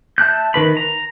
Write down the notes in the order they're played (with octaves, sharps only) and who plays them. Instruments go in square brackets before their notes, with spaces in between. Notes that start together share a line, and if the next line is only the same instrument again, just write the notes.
[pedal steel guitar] E5 A5 F#6 G6
D#3 B4 B5
A#5